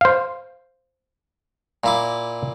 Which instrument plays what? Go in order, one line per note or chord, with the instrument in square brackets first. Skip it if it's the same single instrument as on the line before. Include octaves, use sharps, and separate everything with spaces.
[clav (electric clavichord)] C5 F5
[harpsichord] A#2 E4 D6